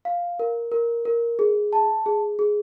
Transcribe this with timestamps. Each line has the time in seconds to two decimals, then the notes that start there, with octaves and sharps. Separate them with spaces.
0.05 F5
0.39 A#4
0.72 A#4
1.05 A#4
1.39 G#4
1.73 A5
2.06 G#4
2.39 G#4